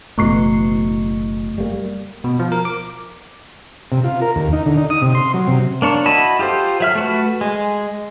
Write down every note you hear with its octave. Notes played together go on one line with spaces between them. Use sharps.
F#1 B2 E3 A3 C#6 C7
G3 A3 A#3
B2
F3
A#4
D6
C3
F4
A#4
D#2
D#4
D3
D#4
D#6
C3
C6
F#3
C3
A#3 D4 C#5
E4 F#4 D#5 A5 B5
F4 G4 A4 C5
F#3 E5 F6
A3 F#4 B4
G#3